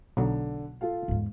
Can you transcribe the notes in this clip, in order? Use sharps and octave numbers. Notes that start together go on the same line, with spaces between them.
B1 D3 F#3
F4 A4 F5
E2 G#2